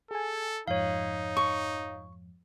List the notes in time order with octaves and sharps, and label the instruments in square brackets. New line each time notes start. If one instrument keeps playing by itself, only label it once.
[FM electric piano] G#4 G#5 [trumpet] A4
[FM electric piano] F2 G#2 F3 [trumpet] D#4 [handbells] C#5 F5
[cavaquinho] C#6